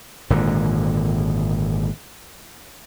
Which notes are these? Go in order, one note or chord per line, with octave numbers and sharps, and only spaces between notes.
G#1 A#2 D3